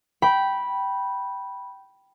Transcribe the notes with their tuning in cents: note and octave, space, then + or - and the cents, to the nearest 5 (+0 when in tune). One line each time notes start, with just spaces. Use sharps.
G5 -10 B5 -10